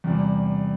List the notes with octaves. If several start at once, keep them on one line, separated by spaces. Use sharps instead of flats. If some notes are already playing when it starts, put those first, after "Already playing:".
E2 C3 G3